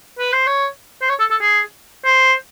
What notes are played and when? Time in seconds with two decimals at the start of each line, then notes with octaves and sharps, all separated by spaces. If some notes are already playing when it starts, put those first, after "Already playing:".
0.19 B4
0.33 C5
0.47 C#5
1.02 C5
1.09 C#5
1.20 A4
1.31 A4
1.41 G#4
2.05 C5